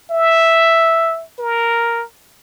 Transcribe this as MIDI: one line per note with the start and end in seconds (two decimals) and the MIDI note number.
0.10 1.24 76
1.39 2.03 70